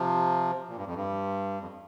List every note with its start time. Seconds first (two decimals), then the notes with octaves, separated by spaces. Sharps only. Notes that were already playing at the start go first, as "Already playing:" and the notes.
Already playing: C3 F3
0.69 A#2
0.77 G2
0.86 F2
0.95 G2
1.60 F2